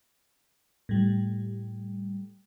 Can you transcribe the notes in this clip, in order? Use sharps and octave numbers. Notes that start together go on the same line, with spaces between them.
A2 G3